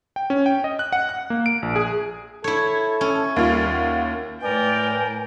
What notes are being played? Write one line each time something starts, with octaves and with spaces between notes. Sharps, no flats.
G5
C#4
G5
D#5
F#6
F#5
F#6
A#3
D7
A#1
G#4
E4 A4 C#5
C#4
D#2 G3 F4
F#5
A2 A#4 B4 D5 G5 G#5